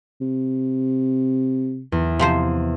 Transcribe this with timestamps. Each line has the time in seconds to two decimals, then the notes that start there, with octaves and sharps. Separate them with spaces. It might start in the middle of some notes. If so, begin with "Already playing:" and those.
0.21 C3
1.92 E2
2.19 C3 F3 C5